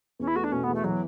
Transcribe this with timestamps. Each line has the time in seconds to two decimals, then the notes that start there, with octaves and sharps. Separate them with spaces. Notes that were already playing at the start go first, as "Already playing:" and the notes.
0.19 E2 C#4
0.27 E4
0.35 A3 F#4
0.44 D4
0.52 B2 C#4
0.63 E2 B3
0.74 A3
0.84 E3 F#3